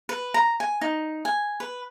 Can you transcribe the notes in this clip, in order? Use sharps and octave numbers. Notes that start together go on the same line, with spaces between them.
B4
A#5
G#5
D#4
G#5
B4